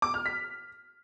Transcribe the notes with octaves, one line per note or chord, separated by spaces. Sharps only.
D6
F6
B6